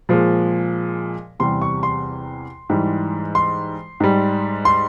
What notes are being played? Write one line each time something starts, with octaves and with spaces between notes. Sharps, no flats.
A#2 F3 G#3
E2 C3 G3 C6
C#6
C6
G#2 E3 G3
C6
G#2 G3
C6